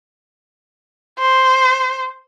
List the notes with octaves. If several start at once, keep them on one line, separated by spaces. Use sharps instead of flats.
C5